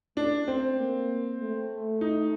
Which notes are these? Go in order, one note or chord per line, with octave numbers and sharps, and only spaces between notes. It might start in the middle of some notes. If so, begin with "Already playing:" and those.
A3 D4
C4
A#3
A3
D#4